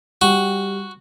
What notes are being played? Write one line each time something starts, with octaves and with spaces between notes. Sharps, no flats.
G3 F#4